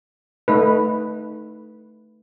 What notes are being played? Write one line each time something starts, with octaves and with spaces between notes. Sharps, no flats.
A3 D#4 B4